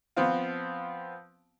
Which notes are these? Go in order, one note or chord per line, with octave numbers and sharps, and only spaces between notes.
F3 B3 C4 F4